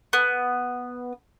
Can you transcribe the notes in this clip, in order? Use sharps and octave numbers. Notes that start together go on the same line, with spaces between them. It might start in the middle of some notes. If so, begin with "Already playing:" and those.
B3